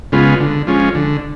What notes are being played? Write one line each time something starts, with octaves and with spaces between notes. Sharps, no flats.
C#3 G#3 B3 F4
D3
F3 G#3 C#4
D3